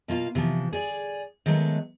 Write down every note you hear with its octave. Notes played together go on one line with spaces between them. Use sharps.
B2 A#3 F4 F5
C3 E3 F3
G#4 D5
D#3 F#3 G#3 A3 B3